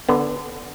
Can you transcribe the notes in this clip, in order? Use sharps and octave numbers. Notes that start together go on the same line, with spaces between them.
D3 B3